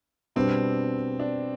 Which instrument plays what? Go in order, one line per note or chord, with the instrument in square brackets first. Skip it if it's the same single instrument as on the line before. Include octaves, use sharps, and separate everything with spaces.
[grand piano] B2 G3 B3 D4 [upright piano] C4
[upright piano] D4